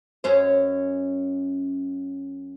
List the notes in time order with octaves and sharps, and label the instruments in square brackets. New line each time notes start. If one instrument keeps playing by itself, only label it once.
[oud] F#2 C#4 C5